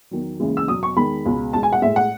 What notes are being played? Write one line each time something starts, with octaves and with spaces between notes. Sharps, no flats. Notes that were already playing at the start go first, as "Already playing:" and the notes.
E2 D#3 F#3
D#2 C#3 E3 G#3
E6
E2 B2 F#3 D#6
C#6
E2 D#3 G#3 B5
C#2 B2 G#3
E2 B2 G#3 A5
G#5
F#5
A2 G#3 E5
F#5